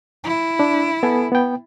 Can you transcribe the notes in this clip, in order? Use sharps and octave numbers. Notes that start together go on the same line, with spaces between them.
E4
D4
B3 A4 G#5
B3 G5